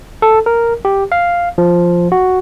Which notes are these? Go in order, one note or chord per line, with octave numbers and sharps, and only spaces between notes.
A4
A#4
G4
F5
F3
F#4